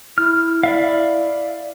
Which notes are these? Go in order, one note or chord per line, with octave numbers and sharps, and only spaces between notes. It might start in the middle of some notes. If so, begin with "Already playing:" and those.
E4 F6
D5 E5 F5